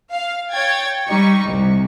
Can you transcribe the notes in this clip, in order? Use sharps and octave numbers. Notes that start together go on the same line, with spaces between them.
F5
C#5 G5 G#6 A6
G3 D#4 C#6
C2